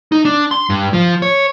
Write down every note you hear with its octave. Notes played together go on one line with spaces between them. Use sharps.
D#4
D4
C6
G2
F3
C#5